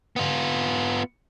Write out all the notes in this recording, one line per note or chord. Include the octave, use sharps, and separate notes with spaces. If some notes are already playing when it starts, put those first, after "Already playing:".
B3 F4